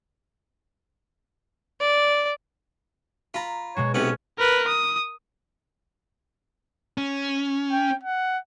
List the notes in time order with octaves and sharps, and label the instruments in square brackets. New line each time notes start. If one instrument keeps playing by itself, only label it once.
[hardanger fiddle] D5
[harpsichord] F4 [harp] A#5 B5
[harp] B2 G#3 F#4 [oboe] C#5
[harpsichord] B1 C3 B4 [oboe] C#4
[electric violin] A#4 B4
D#6
[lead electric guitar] C#4
[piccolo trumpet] G5
F#5